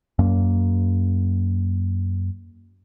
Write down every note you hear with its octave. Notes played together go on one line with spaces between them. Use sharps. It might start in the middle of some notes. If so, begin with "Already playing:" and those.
F#2 A#3